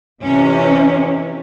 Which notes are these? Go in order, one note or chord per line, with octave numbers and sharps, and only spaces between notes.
F2 C3 E3 C#4